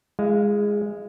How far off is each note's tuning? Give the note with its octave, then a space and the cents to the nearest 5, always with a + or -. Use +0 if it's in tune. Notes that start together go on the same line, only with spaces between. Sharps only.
G#3 -5 E4 +40 F5 +0